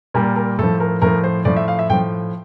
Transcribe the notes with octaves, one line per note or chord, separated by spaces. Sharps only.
A#2 G3 A#4
A#4
A2 F3 A4
A#4
A2 F3 A#4
C5
A2 F3 D5
E5
F5
E5
A2 F3 G5